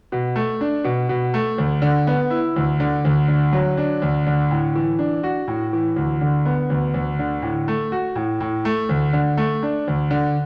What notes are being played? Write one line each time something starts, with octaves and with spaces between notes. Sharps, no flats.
B2
A3
D4
B2
B2
A3
D2
D3
B3
E4
D2
D3
D2
D3
F#3
D4
D2
D3
A2
E3
D4
F#4
A2
E3
D2
D3
B3
D2
D2
D3
A2
A3
F#4
A2
A2
A3
D2
D3
A3
D4
D2
D3